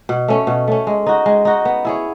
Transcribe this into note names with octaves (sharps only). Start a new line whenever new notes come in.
B2
A3 C#4
B2
A3 C#4
G#3
D#4 F#4
G#3
D#4 F#4
B3
E4 G#4 C#5